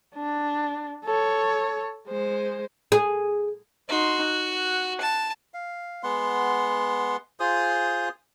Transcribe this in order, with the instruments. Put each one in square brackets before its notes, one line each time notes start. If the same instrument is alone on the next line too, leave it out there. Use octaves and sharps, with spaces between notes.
[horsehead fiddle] D4
A4 C#5
G#3 C5
[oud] G#4
[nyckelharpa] D#4 C6 [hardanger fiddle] F#4
[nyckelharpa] F#5
[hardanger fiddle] A5
[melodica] F5
G#3 B3 F#5 C6
F4 G#4 C5 D#6